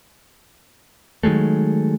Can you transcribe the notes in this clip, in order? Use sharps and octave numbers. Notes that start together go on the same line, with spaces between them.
D#3 F#3 G#3 A3